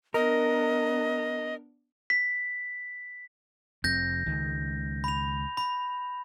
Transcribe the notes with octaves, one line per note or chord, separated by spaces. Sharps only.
B3 D4 A#4 D#5
B6
F1 F2 C4 G6 A#6
C#2 D#3
B5 F7
B5